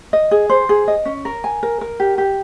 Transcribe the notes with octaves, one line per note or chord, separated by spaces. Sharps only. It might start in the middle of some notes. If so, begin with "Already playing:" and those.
D#5
G#4
C5
G#4
D#5
C#4
A#4
G#5
A#4
A#4
G4
G4